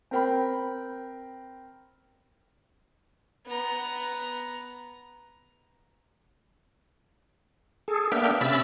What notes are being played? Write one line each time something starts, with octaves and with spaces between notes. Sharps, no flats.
C4 A#4 G5 B5
B3 A#5
G#4 A4
A#3 B3 D4 E5 G5 F6
C3 C#4 E5 B5 E6 A6